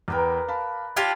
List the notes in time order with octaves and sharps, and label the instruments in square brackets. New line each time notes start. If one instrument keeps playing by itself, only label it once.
[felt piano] E2 G5 [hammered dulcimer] A#4 B4 D5
[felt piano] F5 A5 B5
[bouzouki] D4 F4 G4 [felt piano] G#6